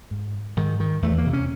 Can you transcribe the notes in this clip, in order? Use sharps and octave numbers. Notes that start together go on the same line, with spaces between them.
G#2
G#2 D#3
D#3
E2 A3
A#3
C3
C#4